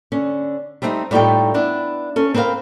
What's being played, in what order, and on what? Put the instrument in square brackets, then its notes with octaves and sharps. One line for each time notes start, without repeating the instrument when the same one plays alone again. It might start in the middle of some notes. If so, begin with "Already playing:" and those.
[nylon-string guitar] D3 C#4
G3 A3 C4 D4 D#4
A2 G3 D#4 F4 A4 G5
B3 D4 E4
C#4 A4
C4 A#4 B4 D5 F5